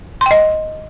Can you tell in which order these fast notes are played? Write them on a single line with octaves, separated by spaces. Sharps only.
C6 G5 D#5